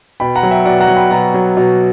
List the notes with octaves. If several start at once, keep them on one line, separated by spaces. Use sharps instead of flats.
B2 G5 B5
F#5 A#5
F#3
E5 G5
B2 D5 F#5
F#5 A#5
F#3
G5 B5
B2 F#5 A#5
F#3
B2